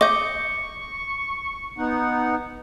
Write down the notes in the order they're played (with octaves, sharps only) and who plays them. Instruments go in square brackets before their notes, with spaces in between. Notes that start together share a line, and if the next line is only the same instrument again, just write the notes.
[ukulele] D#5 [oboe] C#6 [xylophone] D6 G6
[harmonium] B3 D#4 F#5